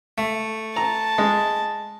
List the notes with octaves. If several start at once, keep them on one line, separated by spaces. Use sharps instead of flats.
A3
A5 A#5
G#3